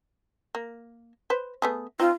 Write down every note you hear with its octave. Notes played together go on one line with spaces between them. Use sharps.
A#3
B4 C5
A3 B3 G#4
C4 D#4 F4